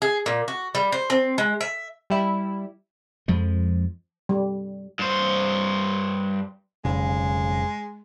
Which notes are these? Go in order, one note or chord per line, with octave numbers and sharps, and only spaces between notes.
G#4
A#2
F#4
G3
C5
C4
G#3
E5
G3 E4
F2 F3 G#3
G3
G2 C5
F1 B1 C#3 G#3